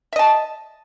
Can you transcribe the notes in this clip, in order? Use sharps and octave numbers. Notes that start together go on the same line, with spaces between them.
D#5 E5 A5